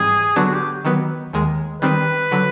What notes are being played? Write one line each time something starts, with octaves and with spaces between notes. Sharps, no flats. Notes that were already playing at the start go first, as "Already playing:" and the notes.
Already playing: G#2 E3 G3 C4 G#4
D3 F#3 B3 D4 F#4
G4
D#3 F#3 B3
D#2 D#3 G#3
D#3 G3 C4 B4
D3 F#3